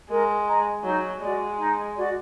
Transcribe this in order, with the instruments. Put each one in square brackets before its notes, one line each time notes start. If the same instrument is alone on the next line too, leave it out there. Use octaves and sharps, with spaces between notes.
[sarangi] G#3 [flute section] A#4
[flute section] D#5 A#5
[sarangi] F#3 [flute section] D#4
[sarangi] G#3 [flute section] F#4 D5
[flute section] D#4
F#4 D5